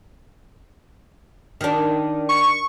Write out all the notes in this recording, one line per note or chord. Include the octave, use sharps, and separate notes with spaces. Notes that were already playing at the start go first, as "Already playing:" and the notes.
D#3 D4
C#6